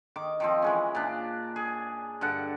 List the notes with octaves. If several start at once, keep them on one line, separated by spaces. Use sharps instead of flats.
D#3 D6
D#3 F3 C4
E3 G#3 C#4
A#2 D4
G#4
G2 D3 F#5